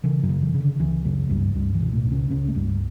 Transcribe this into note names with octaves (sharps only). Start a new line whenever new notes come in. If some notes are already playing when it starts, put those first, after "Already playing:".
C#3 E3
F#2 F#3
C#3
E3
C#3
D3
C#2 E3
F#2 C#3 F#3
C#2 G2 G3
C#2 G2 G3
E3
B2
A2 A3
C#2
C#3 C#4
C#2 C#3 C#4
A3
C#2 G2 G3